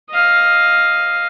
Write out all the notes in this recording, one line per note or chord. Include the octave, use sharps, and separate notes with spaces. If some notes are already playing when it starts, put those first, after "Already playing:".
D#5 F5